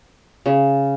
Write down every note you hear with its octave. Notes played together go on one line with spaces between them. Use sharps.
C#3